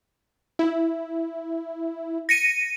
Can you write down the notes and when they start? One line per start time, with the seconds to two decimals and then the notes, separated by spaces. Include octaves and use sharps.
0.59 E4
2.29 A#6 C#7 D#7